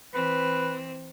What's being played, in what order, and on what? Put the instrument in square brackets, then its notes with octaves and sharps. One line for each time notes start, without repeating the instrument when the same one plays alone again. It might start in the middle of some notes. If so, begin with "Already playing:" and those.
[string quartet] E3 C4 [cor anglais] B4